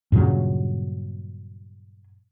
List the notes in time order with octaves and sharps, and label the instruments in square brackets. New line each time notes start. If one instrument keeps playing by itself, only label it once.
[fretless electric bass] G2 A#2 C#3 F#3